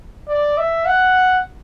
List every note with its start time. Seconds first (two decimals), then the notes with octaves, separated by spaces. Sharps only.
0.28 D5
0.58 E5
0.86 F#5